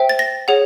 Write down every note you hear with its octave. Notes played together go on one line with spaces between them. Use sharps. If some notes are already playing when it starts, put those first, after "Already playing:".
Already playing: C5 E5 G5
A6
A#6
G#4 C#5 F#5